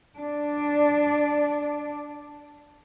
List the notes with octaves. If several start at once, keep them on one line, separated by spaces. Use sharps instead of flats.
D4 D5